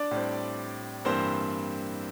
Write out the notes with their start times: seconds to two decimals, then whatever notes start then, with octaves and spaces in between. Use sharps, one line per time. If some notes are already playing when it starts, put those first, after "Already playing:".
Already playing: D4 D5
0.11 A2 G3 C4
1.05 G2 E3 G3 A#3 C4 C5